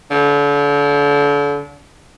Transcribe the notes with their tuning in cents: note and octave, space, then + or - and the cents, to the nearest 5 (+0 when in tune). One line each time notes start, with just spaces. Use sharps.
D3 -35